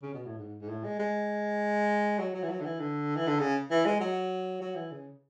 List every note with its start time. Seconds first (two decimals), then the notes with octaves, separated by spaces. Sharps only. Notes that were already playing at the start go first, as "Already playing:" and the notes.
0.02 C#3
0.14 B2
0.26 A2
0.39 G#2
0.61 G#2
0.69 A2
0.84 G#3
0.99 G#3
2.19 F#3
2.34 F#3
2.43 E3
2.50 F#3
2.60 D3
2.65 E3
2.79 D3
3.16 E3
3.27 D3
3.39 C#3
3.71 E3
3.85 G#3
4.00 F#3
4.61 F#3
4.76 E3
4.91 C#3